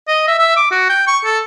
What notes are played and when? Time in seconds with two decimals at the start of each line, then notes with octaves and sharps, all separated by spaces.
0.08 D#5
0.28 E5
0.39 E5
0.57 D6
0.71 F#4
0.89 G5
1.07 C#6
1.25 A4